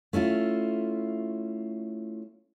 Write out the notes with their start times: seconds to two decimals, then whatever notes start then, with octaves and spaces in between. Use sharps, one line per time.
0.13 A3 C#4 E4 F4